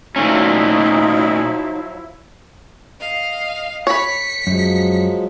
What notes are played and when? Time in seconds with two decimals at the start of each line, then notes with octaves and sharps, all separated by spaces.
0.16 A#2 F3 F#3 A3 C#4 D#4 E4
3.00 D#5 F5
3.87 C#5 B5 B6 C#7
4.47 F#2 F3 F#3 G#3